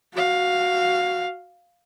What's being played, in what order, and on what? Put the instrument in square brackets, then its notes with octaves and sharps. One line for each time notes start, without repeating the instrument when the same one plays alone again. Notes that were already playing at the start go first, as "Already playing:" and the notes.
[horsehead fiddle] F#4 F5